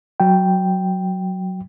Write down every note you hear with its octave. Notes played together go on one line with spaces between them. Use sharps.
F#3 G5